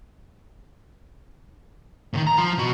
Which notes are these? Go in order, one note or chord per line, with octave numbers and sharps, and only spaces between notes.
A2 D#3
A#5
F3 F4
B2 F#4